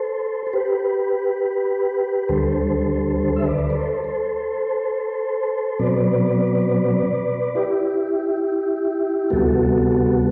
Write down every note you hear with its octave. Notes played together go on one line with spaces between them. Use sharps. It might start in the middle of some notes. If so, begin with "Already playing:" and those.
Already playing: A4 C5
A4
G4 B4
D2 D3 G3 A4 C5
A4 C5
E5
B4 D5
D5
A4 C5
A4 C5
B2 F#3 C4 B4 D5
E4 G4
D2 C3 G3 B3 F#4 A4